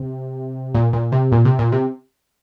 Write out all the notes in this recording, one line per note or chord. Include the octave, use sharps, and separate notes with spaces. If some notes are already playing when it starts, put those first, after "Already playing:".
Already playing: C3
A#2
A#2
C3
A#2
C3
A#2
C3